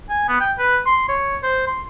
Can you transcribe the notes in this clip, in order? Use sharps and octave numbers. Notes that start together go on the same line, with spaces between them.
G#5
B3
G5
B4
C6
C#5
C5
C6